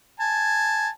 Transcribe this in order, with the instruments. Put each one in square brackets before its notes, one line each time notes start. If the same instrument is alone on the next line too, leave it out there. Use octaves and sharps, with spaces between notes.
[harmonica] G#5 A5